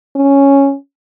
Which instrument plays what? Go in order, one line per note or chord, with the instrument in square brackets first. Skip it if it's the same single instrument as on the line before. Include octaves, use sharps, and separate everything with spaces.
[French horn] C#4